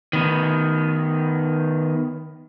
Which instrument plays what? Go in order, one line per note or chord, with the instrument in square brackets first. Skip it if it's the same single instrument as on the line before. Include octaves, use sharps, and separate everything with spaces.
[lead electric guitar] D#3 B3